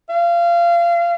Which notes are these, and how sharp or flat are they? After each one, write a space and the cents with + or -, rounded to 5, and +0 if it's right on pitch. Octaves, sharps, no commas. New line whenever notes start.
F5 -25